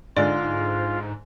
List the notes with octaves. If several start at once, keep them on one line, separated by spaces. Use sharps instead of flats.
G#2 D3 G#3 F4 D5